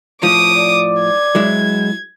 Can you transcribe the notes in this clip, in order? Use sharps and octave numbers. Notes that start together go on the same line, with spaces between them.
A2 F3 D6 D#6
D5
G#6
F#3 G#3 E4